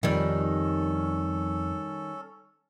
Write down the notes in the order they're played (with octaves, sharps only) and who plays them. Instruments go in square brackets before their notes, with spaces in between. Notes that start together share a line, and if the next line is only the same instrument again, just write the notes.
[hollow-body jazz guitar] F2 [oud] D#3 G3 [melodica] C#4 A4